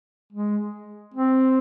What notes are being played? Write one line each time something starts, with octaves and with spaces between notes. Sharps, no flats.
G#3
C4